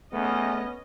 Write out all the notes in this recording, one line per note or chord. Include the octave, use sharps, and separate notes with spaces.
E2 A3 B3 C#4 D#5